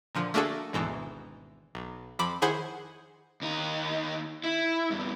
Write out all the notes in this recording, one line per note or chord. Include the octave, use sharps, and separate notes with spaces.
A#2 D3 F3
A3 A#3 D4 F#4 G#4 A4
G#1 D2 G#2 B2 E3
B1
F2 F3 B5 D6
D#3 E4 G#4 C5 F#5 G#6
D#2 D#4
E4
E2 G2